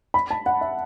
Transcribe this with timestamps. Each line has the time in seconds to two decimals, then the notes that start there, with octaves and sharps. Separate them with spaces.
0.14 B5
0.31 A5
0.46 F#5
0.61 E5